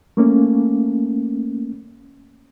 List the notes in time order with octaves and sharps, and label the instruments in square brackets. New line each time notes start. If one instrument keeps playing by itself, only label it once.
[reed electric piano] A3 A#3 C#4